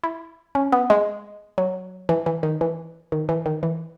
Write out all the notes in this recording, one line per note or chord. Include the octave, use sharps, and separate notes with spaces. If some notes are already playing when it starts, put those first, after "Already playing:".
E4
C#4
B3
G#3
F#3
E3
E3
D#3
E3
D#3
E3
D#3
E3